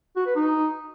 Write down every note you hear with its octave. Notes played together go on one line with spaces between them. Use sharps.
F#4
B4
D#4